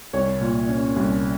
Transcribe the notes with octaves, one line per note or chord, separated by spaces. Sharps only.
C2 C#5
A#2
C#4
C2